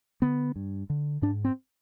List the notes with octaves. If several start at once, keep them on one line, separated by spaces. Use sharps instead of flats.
D3 B3
G2
D3
G#2 D4
C4